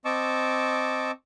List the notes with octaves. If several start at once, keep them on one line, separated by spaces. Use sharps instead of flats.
C4 D#5 A5 C#6 D6 E6